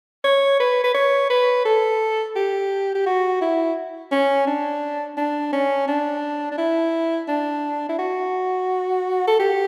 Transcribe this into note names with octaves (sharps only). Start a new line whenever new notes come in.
C#5
B4
B4
C#5
B4
A4
G4
G4
F#4
E4
C#4
D4
D4
C#4
D4
D4
E4
D4
E4
F#4
A4
G4